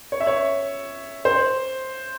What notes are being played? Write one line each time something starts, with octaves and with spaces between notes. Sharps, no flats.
C#5
E5
C#5
C5